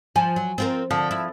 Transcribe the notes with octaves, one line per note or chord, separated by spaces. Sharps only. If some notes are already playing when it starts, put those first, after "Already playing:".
F3 G#5
F#3
C4 F4 A#4
D3 F3
E4